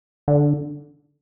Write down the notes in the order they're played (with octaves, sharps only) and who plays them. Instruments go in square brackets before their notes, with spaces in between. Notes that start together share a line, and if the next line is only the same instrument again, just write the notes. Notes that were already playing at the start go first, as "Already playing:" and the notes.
[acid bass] D3